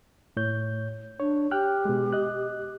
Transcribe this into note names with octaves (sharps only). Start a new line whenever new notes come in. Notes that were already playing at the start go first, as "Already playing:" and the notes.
A2 C#5 G6
D4 C#5
G4 G5 F6 F#6
B2 G#3
D#5 F#6